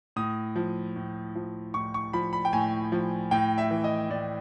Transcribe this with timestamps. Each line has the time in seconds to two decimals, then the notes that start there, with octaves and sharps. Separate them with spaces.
0.16 A2 D#6
0.56 F3
0.96 A2
1.35 F3
1.74 A2 C#6
1.94 C#6
2.13 F3 B5
2.33 B5
2.45 G5
2.53 A2 G#5
2.92 F3
3.31 A2 G5
3.58 E5
3.71 E3
3.84 D#5
4.10 A2 D5